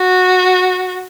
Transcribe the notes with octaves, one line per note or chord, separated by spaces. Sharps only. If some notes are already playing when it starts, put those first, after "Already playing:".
Already playing: F#4